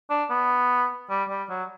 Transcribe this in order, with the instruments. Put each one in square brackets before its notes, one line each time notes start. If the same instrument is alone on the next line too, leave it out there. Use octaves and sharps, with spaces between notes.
[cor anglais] D4
B3
G3
G3
F#3